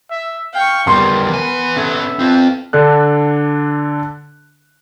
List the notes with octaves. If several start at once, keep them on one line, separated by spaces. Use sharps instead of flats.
E5
F5 G5 C#6
E2 G3 B3 A#4 C6
E3 G#5
C#4 A4 E5
C4 F4
D3 D4 A4 F#6